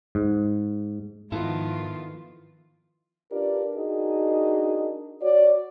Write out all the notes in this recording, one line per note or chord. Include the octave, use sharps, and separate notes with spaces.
G#2
G#2 D#3 F3 B3 E4 F4 A4
D4 F4 G4 A#4 B4 D5
D4 D#4 F#4 G#4 A#4 D#5
F#4 C#5 D5